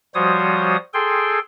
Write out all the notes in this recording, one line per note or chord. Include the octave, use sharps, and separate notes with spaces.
F3 G3 F#4 C5 C#5 D#6
G#4 A4 G5 C6